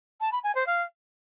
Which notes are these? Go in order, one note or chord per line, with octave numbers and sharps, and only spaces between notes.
A5
B5
G#5
C5
F5